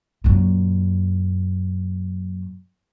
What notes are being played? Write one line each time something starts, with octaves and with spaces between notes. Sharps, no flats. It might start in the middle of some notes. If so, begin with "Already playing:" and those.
F#2 A#2